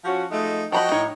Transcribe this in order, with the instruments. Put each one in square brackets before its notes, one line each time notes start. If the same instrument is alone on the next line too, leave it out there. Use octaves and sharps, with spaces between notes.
[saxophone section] F3 C#4 F#4
[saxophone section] F3 G#3 A3 [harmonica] D#4
[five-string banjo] F3 A#5 B5 [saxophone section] F#4 [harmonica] D#5 G5
[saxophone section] A2 C#5 [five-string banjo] D#4